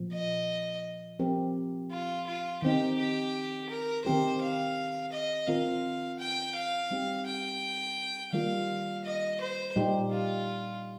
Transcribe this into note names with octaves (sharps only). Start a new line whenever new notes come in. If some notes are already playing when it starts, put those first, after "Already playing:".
Already playing: A#2 F3 A#3
D#5
F3 C4 G4 A#4
F4
F4
D#3 C4 D#4 G4
G4
A#4
D#3 C4 G4 A#4 C5
F5
D#5
D#3 C4 F4 A#4 F5
G5
F5
G3 C4 D#4 G4
G5
D#3 G3 A#3 F4 F5
D#5
C5
A#2 G3 D#4 G4
F4